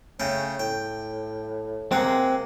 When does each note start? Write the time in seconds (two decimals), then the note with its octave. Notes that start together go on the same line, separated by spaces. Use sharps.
0.20 C#3 A3 C#4 G5
0.59 A2 G5
1.92 C3 G#3 A#3 C4 F#5